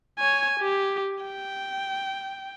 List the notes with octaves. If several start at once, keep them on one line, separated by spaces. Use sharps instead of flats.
C#5 G#5
G4
G5